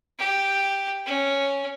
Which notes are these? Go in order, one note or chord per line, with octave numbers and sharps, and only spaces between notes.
G4
C#4